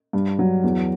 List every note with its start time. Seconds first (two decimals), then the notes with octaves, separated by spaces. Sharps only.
0.13 G2
0.39 F#3
0.63 E2